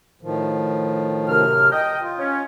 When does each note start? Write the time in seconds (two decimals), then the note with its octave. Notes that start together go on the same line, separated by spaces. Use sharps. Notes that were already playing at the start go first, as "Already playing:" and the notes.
0.22 A2 D#3 F3
1.28 F#2 C3 F6
1.71 D#5 G5
2.01 F4
2.18 C#4